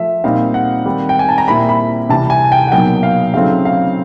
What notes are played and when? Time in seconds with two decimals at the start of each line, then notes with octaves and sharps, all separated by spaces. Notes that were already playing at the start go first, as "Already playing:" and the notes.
Already playing: F3 A3 E5
0.24 A#2 G3 C4 D#4 F5
0.54 F#5
0.85 D#3 G3 C4
1.09 G5
1.19 G#5
1.29 A5
1.38 A#5
1.48 A#2 G3 C4 E4 B5
1.69 B5
2.09 C3 E3 G3 A5
2.30 G#5
2.52 G5
2.68 F#5
2.72 B2 F#3 A#3 D#4 G5
3.03 F5
3.34 C#3 F#3 A3 C4 D#4 F5
3.65 F5